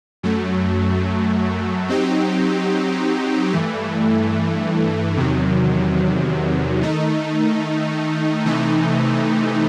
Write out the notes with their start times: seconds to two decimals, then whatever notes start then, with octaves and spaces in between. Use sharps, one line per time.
0.23 F#2 F#3 A3
1.88 F#3 C4 D#4 G4
3.53 G2 E3 A3
5.17 E2 C3 D#3 F#3
6.81 D#3 A3 D#4
8.46 C3 E3 A3 D#4